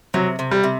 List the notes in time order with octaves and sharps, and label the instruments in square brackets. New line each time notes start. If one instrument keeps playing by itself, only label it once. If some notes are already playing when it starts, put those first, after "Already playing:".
[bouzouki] C3 [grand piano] F#3
[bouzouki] C3
[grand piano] G3
[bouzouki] C3